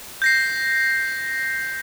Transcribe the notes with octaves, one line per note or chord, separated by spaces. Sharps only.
G6 A#6 C7